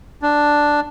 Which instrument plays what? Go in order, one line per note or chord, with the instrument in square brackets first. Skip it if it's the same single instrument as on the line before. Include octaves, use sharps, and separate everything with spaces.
[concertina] D4